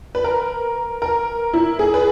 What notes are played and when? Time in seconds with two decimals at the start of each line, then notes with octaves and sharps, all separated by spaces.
0.15 B4
0.24 A#4
1.02 A#4
1.53 E4
1.79 G#4
1.94 B4